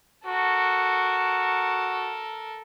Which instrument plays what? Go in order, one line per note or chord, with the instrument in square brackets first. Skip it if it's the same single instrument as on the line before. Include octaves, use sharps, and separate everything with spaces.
[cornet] F#4 [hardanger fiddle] A4 A#4